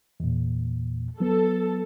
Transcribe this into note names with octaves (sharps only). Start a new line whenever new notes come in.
E2 A#2
F#3 B3 A4